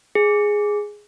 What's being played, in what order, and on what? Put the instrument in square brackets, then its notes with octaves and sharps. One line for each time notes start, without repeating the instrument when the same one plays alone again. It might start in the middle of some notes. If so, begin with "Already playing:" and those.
[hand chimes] G#4